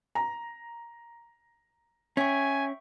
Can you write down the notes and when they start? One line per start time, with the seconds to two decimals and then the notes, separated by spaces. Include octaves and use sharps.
0.15 A#5
2.17 C#4 E5 G5 G#5 C#6